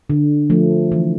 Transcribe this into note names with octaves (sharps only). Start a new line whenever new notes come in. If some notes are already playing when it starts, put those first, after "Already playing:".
D3
F3 A3
E3